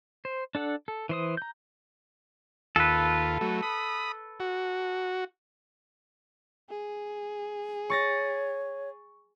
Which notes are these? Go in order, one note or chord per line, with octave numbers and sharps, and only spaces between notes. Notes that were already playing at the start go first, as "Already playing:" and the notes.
C5
D4 A4 F#5
A4
E3 C5 D#6
A#5 G6
D#2 F4 A4 B4
F#3 A3
B5 D#6
F#4
G#4
C#5 C#6 A6 A#6